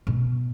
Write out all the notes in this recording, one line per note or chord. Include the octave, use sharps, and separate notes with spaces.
B2